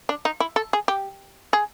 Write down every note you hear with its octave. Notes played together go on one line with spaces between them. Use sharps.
D4
D#4
E4
A4
G#4
G4
G#4